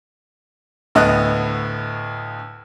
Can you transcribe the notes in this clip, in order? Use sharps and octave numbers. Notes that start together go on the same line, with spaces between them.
D2 A2 B3 D#5 F#6